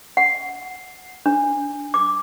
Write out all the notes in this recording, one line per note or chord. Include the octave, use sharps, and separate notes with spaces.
F#5
D4
D6